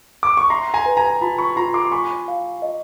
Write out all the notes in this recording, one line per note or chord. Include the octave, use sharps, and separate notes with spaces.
D6
C#6
E5 A#5 C6
G#5 A#5
B4
G#5 A#5
F4 A5 B5
B5 C#6
F4 A#5 C6
C6 D6
G#5 B5 C#6
F5
D#5